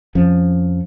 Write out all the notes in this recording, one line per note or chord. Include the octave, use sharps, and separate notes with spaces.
F2 F3 C#4